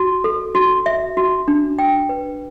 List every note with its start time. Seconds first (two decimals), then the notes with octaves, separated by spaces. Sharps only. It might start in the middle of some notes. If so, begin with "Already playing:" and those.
Already playing: F#4
0.24 A4
0.55 F#4
0.86 E5
1.17 F#4
1.48 D4
1.79 G5
2.09 B4